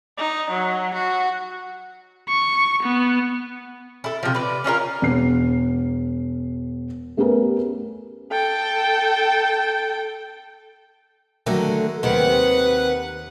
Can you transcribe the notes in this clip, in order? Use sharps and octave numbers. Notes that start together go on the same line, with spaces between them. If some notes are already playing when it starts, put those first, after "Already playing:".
D#4
F#3
F#4
C#6
B3
E4 A4
C3 F3
B4 D5
C#4 D4 F4 A#4
E1 C7
A3 B3 C#4 G4 A#4 B4
A4 G5
D3 D#3 F#3 A3
D#2 C3 D#3 B4 F#5